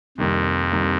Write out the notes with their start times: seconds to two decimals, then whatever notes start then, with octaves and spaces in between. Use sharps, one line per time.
0.18 C2 F2 C3 D#3 G3 A#3
0.72 C2 C3 D#3 G3 A#3